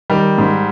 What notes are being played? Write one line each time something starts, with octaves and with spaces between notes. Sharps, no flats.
D#3 G3
G#2